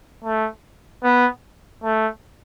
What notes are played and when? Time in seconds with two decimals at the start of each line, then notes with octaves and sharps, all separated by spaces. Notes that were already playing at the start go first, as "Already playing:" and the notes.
0.24 A3
1.03 B3
1.84 A3